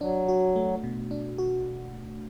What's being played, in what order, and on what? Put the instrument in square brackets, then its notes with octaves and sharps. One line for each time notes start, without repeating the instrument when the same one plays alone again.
[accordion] F#3 [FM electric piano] D4
[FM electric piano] F#4
A3
B2
D4
F#4